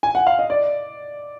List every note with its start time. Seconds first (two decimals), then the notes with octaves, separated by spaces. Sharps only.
0.03 G#5
0.15 F#5
0.27 F5
0.39 D#5
0.50 D5